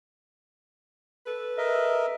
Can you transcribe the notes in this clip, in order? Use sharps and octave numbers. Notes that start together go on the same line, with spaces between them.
A4 B4
A#4 D#5 E5